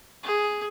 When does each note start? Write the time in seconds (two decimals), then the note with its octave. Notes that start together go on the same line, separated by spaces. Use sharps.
0.23 G#4